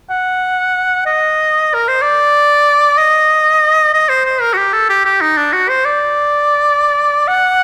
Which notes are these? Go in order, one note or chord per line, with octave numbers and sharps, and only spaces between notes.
F#5
D#5
A#4
C5
D5
D#5
D#5
C5
C5
A#4
F#4
G4
A4
G4
G4
D#4
D4
F#4
C5
D5
F#5